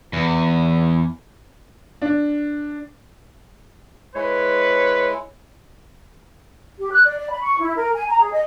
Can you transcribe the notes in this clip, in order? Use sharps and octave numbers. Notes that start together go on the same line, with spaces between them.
E2
D4
G#3 E4 B4 C#5
G4
F#6
D5
D5
B5
C#6
E4
A#4
G#5
A#5
G#4
D#5